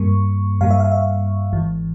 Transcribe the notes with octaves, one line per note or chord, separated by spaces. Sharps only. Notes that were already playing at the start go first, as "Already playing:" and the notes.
Already playing: G2 G3 A#3 C#6
G2 G3 A#3 F5
E5
F5
E5
G#1 G#2 E3